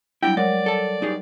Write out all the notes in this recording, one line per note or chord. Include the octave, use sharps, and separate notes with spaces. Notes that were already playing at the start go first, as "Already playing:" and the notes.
F#3 G3 D4 E4 G5
G#3 A#4 C#5 D5 F#5
A4 A5
D#4 G4 G#4